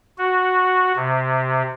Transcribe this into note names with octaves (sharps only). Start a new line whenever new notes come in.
F#4
C3